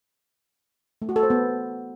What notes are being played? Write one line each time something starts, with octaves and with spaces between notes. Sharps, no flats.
A3
F#4
A4
C5
B3